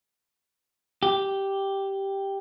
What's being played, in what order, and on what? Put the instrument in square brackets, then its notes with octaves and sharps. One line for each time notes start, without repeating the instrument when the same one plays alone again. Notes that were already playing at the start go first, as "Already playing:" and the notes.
[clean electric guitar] G4